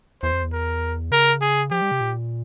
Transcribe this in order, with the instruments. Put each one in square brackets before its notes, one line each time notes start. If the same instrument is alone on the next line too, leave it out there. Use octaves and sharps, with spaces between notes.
[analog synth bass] E2 [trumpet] C5
[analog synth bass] F2
E2
[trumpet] A#4
[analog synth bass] C#3 [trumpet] A#4
[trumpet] G#4
[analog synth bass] F3 [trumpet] G4
[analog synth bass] G3
C3
A#2